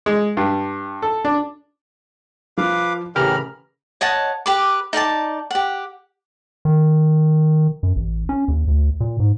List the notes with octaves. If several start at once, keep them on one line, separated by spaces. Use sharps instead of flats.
G#3
G2
A4
D4
F3 B4 F5 D6
A2 C#3 E3 G4 A#4 B5 F6
C#5 D#5 F#5 A5
G4 B4 D6
D#4 D5 E5 A5
G4 F#5
D#3
F#2
A1
C#4
D#2
D2
A#2
G#2